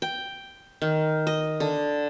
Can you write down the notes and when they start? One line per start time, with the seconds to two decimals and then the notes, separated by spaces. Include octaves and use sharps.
0.02 G5
0.82 D#3
1.27 D#5
1.60 D3